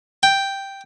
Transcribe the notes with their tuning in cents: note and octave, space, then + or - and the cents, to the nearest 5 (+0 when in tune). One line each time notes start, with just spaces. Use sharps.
G5 +0